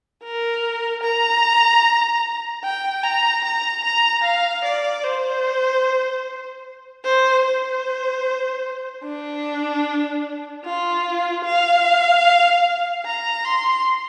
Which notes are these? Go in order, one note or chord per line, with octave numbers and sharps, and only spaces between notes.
A#4
A#5
G5
A#5
A#5
A#5
F5
D5
C5
C5
C5
D4
F4
F5
A#5
C6